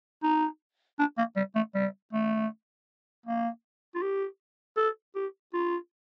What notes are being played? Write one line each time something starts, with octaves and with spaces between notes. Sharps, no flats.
D#4
D4
A#3
G3
A3
G3
A3
A#3
F4
G4
A4
G4
F4